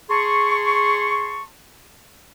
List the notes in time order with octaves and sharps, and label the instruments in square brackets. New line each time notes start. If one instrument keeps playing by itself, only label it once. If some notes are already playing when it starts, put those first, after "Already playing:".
[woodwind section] G#4 A5 C6 C#6